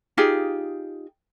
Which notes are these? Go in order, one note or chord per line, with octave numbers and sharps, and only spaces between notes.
D#4 F4 G4 G#4